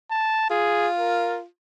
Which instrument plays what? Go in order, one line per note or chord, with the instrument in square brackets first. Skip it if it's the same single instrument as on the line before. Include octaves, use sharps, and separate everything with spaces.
[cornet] A5
[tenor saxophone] F4 [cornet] G#4
[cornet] A#4